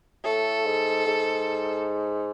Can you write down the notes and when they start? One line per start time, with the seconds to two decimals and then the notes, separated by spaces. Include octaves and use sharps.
0.24 A2 A4
0.65 G#2
1.07 G#2